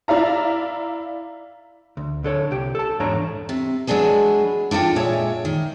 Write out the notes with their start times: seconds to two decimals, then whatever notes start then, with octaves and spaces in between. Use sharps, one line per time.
0.08 E4 D5 F5 A#5
1.97 D2
2.24 D3 A4 C#5
2.51 C2 G4
2.75 A4 A5
3.00 E2 G#2 D4 C#5 A#5
3.49 C3
3.87 F#3 G#3 D4 G#4 B4
4.71 D4 E4 F4 A4 G5
4.96 A#2 G#3 C#5 E5
5.45 D#3